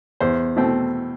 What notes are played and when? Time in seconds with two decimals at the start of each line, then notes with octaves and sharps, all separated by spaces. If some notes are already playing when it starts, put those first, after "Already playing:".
0.20 E2 C5
0.56 B2 A3 C4